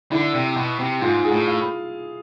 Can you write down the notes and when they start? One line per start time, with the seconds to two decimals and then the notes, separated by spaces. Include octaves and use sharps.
0.12 D3 E4
0.34 C3
0.57 B2
0.79 C3
1.01 G#2 F4
1.24 G#4
1.32 A2
1.47 F5